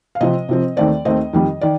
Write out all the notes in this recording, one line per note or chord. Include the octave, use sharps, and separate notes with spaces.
F5
C3 F3 C4 D#5
C3 F3 C4
D#2 D#3 A3 C4 D5
D#2 D#3 A3 C4 D#5
F2 D#3 G3
D#3 D5